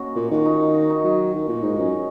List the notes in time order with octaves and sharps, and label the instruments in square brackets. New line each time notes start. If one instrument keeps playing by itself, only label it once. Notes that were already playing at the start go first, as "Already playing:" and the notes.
Already playing: [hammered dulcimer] A#3 C#4 D#4 F#4
[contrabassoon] A#2
[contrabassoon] D#3 [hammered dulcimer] F#4
[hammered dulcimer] D#4
F#4
D#4
[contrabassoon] F#3 [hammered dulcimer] F#4
[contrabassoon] D#3
A#2
[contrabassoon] G#2 [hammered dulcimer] D#4
[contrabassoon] F#2 [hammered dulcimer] C#4
[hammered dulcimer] D#4